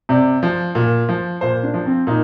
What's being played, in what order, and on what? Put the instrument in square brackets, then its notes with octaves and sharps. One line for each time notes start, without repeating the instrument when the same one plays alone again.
[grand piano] C3 D5
F3
A#2
F3
A#2 C5
D4
F3
C4
A#2 D#4